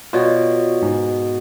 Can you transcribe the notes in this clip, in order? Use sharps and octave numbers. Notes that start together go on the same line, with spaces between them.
B2 F4 C#5 D5
G#2